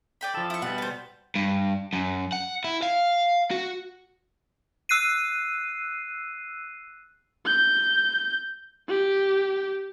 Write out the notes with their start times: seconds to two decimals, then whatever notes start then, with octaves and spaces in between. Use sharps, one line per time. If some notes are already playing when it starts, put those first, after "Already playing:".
0.21 D5 G5 B5
0.35 F3 A4
0.50 E4 C#6
0.62 B2 G3 B3 F#5
0.78 B4 C5
1.36 G2
1.93 F#2
2.32 F#5
2.64 E4
2.82 F5
3.51 F#4
4.89 E6 F#6 C7 D#7
7.46 G6
8.89 G4